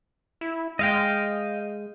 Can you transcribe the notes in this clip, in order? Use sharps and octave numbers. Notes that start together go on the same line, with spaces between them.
E4
G#3 D#5 F5 G5